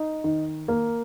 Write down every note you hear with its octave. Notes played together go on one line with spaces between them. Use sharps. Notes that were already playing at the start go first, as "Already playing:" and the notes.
Already playing: D#4
D#3
A#3